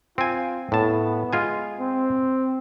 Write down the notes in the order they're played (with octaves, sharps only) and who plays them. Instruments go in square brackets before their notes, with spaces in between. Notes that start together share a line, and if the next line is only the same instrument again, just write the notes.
[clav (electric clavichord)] C4 G#5 [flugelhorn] F4
[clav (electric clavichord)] A2 A5 [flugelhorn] B3
[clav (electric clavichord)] G#3 F4 G#5
[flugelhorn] C4